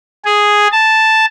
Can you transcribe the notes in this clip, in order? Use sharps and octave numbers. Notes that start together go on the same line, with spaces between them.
G#4
A5